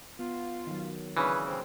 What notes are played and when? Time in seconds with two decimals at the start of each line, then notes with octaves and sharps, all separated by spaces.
0.19 B3 F4
0.67 D#3 F#3
1.17 C#3 E3 B3 D4 G#4 B4 C#5
1.47 A2 D3 C4